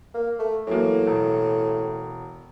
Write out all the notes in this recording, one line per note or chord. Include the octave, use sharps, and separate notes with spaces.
A#3
A3
A2 E3 F#3 A#3
E1